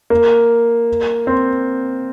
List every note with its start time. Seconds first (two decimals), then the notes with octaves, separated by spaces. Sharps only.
0.10 A#3
1.27 C4